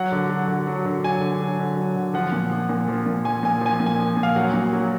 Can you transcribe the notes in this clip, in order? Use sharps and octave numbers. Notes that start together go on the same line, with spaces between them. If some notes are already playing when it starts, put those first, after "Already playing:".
Already playing: F#3 F#5
D3
F#3
D3
F#3
D3
F#3 G#5
D3
F#3
D3
F#3
D3
F3 F#5
A#2
F3
A#2
F3
A#2
F3 G#5
A#2 G#5
F3 G#5
A#2
G#5
F3
A#2
F5
F#3 F#5
A#2
F#3